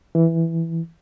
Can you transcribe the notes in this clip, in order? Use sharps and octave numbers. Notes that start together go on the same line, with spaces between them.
E3